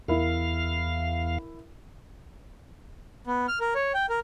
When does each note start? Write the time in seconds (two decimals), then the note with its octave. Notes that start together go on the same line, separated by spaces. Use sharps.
0.08 E2 E4 A#4 F5
3.27 B3
3.48 F6
3.60 A#4
3.75 C#5
3.94 G5
4.10 A#4